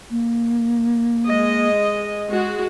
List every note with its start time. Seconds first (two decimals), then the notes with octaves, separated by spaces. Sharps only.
0.11 A#3
1.26 G#3 D#5
2.30 G#3 F#4